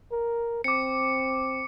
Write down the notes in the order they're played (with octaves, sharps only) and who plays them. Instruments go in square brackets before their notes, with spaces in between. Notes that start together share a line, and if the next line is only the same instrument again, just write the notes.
[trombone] A#4
[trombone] C4 [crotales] D6 C#7